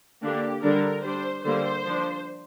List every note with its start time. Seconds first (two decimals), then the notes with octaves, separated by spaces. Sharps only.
0.22 D3 A#3 D4 G4
0.63 D3 G3 D4 A#4
1.03 G3 D4 C5
1.44 D3 G3 A#3 C5
1.85 F3 D4